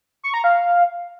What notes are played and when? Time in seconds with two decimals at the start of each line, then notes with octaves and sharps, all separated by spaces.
0.23 C#6
0.34 A#5
0.44 F5